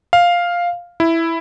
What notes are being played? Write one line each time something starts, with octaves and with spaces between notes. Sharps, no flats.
F5
E4